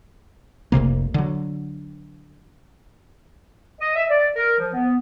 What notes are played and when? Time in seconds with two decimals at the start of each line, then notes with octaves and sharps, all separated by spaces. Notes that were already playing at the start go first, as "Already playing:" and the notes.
0.72 F1 C2 C3 A#3
1.14 D3 F#3
3.80 D#5
3.96 E5
4.09 D5
4.36 A#4
4.59 F3
4.73 B3